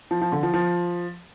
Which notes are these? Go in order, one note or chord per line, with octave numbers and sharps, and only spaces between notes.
F3
F3
D3
F3
F3